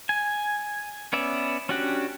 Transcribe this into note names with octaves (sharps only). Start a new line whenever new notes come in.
G#5
B3 C#4 D5 E5
C#4 D4 F#4 G4 F#5